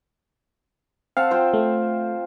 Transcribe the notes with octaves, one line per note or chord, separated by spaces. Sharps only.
C4 F5 F#5 A5
F4 C5 G5
A3